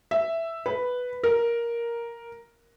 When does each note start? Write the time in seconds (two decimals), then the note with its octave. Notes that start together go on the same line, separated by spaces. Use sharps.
0.11 E5
0.66 B4
1.23 A#4